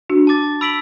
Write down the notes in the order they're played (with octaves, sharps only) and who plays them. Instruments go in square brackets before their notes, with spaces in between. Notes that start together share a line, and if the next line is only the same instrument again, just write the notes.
[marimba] D4 F#4
[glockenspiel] A5 D6 A6
B5 E6 B6 D7 F#7